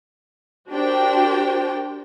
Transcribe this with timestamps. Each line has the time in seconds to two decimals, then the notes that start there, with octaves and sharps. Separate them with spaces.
0.72 D4 F#4 G4 A#4 C5 G5